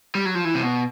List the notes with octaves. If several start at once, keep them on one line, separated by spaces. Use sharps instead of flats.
G3
F#3
F3
E3
C3
B2